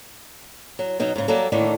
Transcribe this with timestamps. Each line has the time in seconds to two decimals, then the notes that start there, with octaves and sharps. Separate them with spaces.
0.79 F#3
0.99 B2 F#3 D#4
1.16 G#2 C#3
1.28 F#3 G3 A#3 A4
1.52 A2 D3 D#3 A3 A#3